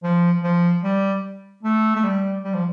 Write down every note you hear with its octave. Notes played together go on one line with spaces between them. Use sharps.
F3
F3
G3
A3
A3
G3
G3
F3